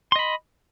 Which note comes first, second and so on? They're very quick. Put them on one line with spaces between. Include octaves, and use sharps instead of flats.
C6 D#5 B5